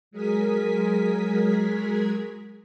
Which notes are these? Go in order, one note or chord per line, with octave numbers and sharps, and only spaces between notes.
F#3 G#3 G#4 A#4 G#5 B6